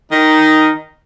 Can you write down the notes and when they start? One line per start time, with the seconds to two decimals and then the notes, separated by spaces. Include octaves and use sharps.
0.12 D#3 D#4